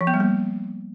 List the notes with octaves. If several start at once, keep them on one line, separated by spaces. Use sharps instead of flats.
F3
B3
G3
A#3